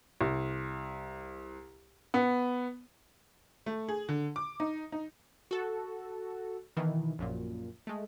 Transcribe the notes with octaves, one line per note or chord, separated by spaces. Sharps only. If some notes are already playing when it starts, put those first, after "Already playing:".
C2
B3
A3
G#4
D3
D6
D#4
D#4
F#4 A4
B2 D#3 E3
A#1 F#2 A#2
G#3 A3